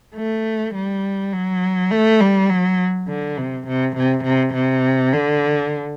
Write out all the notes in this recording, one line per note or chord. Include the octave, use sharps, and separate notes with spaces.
A3
G3
F#3
A3
G3
F#3
D3
C3
C3
C3
C3
C3
D3